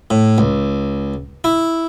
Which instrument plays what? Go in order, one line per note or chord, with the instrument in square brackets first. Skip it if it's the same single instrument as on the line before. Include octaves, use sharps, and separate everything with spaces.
[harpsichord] A2
C#2
E4